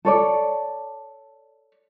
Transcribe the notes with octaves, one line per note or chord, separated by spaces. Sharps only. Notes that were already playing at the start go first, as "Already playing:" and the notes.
A4 C#5 D5